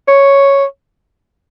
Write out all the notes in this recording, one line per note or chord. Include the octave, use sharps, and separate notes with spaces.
C#5